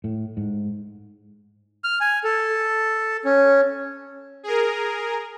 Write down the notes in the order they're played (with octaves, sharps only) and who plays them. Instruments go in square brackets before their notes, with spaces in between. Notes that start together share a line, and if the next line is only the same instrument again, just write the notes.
[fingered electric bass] A2
G#2
[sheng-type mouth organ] F6
G#5
A4
C#4
[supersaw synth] G#4 A#4